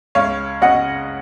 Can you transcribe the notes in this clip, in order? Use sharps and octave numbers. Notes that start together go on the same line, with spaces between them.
C#2 C#5 F5
C#3 D#5 F#5